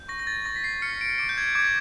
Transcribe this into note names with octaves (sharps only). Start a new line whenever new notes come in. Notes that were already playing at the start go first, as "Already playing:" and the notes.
Already playing: G6
C#6 A#6
A#6
A6
C#6 A#6
B6
C7
F6 C#7
D7
D6 D7
G6
G#6
D6 G#6